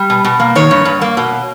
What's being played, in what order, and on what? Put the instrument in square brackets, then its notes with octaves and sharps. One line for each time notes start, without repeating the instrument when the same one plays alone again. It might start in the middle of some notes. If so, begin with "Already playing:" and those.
Already playing: [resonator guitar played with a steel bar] G3
B2
B2
A#3
D#3 C#5
G2
G2
A#3
B2